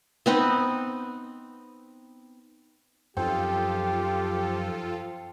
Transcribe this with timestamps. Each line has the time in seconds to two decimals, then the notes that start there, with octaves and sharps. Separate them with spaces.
0.26 B3 C4 D#4 D#5
3.17 F#2 F3 C4 D#4 F4 G4 A4